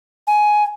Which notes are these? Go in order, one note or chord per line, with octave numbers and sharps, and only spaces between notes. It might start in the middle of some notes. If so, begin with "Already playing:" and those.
G#5